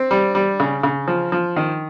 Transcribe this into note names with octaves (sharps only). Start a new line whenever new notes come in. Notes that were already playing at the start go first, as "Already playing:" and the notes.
Already playing: C4
G3
G3
C#3
C#3
F3
F3
D#3